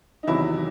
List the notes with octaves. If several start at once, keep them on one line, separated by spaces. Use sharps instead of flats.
D#4
E2 C3 D#3 F#3 E4